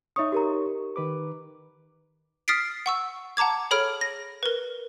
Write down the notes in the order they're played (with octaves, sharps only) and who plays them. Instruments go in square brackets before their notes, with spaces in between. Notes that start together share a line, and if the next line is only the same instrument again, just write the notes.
[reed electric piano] D#4 C#5 C#6 [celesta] E5 D#6
[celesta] G4 A#4 A#5
[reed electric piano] D#3 B4 D6
[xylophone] D#6 F6 A6 B6 C7 D7
F#5 C#6 E6
F#5 A5 A#5 D6 G#6
G#4 A4 C#5 B5 F6 D7
A#6
A#4 B4